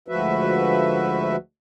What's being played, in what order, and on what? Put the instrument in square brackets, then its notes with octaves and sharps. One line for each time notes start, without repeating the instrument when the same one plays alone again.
[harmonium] D2 G#2 F3 F#4 B4 E5